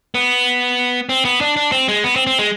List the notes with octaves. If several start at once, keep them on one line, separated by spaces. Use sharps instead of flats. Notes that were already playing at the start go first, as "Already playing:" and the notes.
B3
C4
B3
D4
D4
C4
G#3
B3
C4
C4
G#3